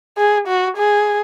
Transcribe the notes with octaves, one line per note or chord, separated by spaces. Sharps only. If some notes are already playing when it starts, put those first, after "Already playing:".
G#4
F#4
G#4